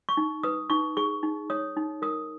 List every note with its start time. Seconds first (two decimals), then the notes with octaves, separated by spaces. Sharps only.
0.09 C#6
0.17 D#4
0.43 B4 D#6
0.70 D#4 C#6
0.97 G#4 C#6
1.23 D#4
1.50 C#5 D#6
1.77 D#4
2.02 A#4 D#6